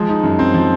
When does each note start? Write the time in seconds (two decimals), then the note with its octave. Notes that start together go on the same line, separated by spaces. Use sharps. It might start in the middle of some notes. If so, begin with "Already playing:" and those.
Already playing: F3 G#3
0.09 D#4
0.23 F#2
0.39 C4
0.54 F3